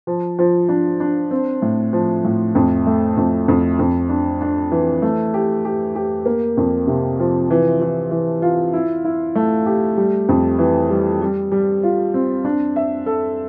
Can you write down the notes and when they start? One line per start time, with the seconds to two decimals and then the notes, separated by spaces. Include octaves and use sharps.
0.07 F3
0.39 F3
0.69 D4
1.00 D4
1.31 C4
1.62 A2
1.93 F3
2.25 A2
2.55 F2
2.86 A3
3.17 F2
3.48 F2
3.79 F2
4.09 D4
4.41 D4
4.72 E3
5.02 A3
5.34 G4
5.65 G4
5.96 G4
6.26 A#3
6.57 F2
6.87 C3
7.19 F3
7.50 E3
7.81 E3
8.11 E3
8.42 F4
8.73 E4
9.05 E4
9.35 A3
9.66 G4
9.97 G3
10.29 F2
10.59 E3
10.90 G3
11.21 G3
11.52 G3
11.83 F4
12.14 C4
12.45 D4
12.76 E5
13.06 A4